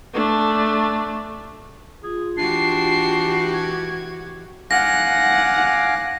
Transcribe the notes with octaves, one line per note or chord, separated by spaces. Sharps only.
A3 D4
F4 G#4
E3 D4 F#4 G4 C7
G#6
F5 F#5 G#5 D6 A#6